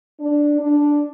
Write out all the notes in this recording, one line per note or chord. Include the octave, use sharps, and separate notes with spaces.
D4
D4